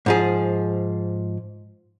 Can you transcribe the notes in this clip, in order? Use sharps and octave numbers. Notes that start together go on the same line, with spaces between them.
G#2 F3 G#4